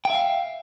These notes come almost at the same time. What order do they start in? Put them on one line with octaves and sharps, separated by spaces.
G5 E5 F5